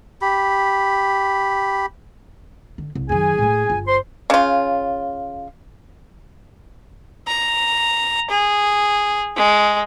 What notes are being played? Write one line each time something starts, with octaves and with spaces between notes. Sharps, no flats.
G4 B5
D3
C2
F#2 D#3 G#4 G#5
A2 A3
G1 F4
C5 C6
C#3 F4
A#5
G#4
G#3